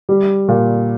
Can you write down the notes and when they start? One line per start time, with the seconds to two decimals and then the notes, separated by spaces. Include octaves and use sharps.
0.09 G3
0.49 A#2